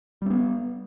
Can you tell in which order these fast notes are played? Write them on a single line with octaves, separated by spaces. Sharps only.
G3 C4 B3